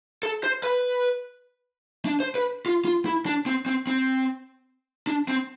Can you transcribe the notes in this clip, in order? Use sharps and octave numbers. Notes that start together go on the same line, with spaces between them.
A4
C5
B4
D4
C5
B4
F4
F4
E4
D4
C4
C4
C4
D4
C4